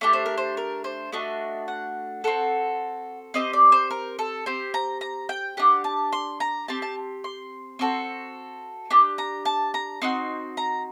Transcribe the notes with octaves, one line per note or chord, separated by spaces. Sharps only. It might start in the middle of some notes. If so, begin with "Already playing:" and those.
A3 D4 G4 D5
C5
A#4
C5
A#4
C5
A3 D4 F#4 D#5
F#5
C4 F#4 A4
C4 G4 D#5
D5
C5
A#4
A4
C4 G4 C5
A#5
A#5
G5
D4 G4 F#5
A5
C6
A#5
C4 G4 A5
A5
C6
C4 F#4 A4
D4 G4
A#5
A5
A#5
C4 D#4 F#4 C6
A#5